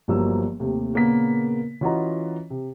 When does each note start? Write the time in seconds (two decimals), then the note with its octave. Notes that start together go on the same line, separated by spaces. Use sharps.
0.08 G1 G2 F3 F#3 A#3 E6
0.60 D#2 C3 A3
0.94 A#2 C#3 A#3 B3 A#4 B6
1.81 E3 C#4 F4 F#4 D#5 A#5
2.50 C3